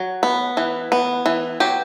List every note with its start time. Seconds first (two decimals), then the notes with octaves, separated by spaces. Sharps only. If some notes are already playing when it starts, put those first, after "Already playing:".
Already playing: F#3
0.23 B3
0.57 E3
0.92 B3
1.26 E3
1.60 F#3 G4